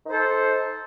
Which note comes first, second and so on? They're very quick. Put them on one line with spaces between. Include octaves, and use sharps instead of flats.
D#4 C5 A4